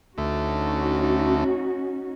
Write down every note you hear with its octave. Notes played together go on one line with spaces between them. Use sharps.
D2 A3 C#4 D#4 F#4